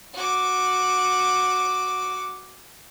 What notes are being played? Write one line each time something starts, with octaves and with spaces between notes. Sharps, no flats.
F#4 D6